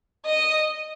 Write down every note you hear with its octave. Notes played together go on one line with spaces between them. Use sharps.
D#5